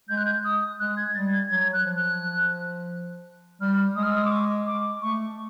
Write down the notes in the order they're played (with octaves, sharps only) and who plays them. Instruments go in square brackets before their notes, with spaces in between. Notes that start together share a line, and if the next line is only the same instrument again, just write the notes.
[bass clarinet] G#3 [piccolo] G6
[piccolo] F#6
G6
D#6
[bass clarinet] G#3 [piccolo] F#6
[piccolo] G#6
[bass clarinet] G3 [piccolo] A6
[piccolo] G#6
[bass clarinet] F#3 [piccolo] G#6
[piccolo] F#6
[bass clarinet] F3
[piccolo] F#6
[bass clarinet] G3 [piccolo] F6
[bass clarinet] G#3 [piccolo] D#6
[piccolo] F6
E6
D#6
D6
C#6
D6
[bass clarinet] A3 [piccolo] C#6